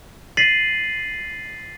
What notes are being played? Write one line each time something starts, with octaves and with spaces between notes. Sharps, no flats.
A6 B6 C7 D#7 F#7